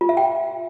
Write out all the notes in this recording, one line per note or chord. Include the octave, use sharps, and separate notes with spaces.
F4
E5
G5